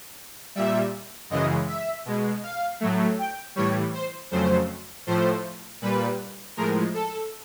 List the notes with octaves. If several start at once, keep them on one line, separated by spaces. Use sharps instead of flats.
A#2 G3 E5
F#2 C#3 E3 G#3 D#5
E5
B2 G#3
F5
A2 F#3 A3
G5
A2 E3 G3 C#5
C5
F2 C#3 F#3 A3 C5
A2 F3 A3 C5
A#2 G3 B4
A2 F3 G#3 A#4
A4